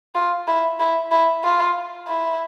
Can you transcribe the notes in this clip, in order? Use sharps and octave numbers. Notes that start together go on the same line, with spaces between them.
F4
E4
E4
E4
F4
E4